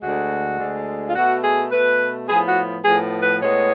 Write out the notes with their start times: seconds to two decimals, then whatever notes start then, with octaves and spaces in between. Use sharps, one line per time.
0.02 D2 D3 G#3 F#4
0.59 D2 D3 G#3
1.09 F4
1.15 B2 A3 F#4
1.44 G#4
1.72 B2 A3 B4
2.29 A2 F3 B3 G#4
2.47 F#4
2.85 A2 F3 B3 G#4
3.23 B4
3.42 A2 G#3 B3 C#5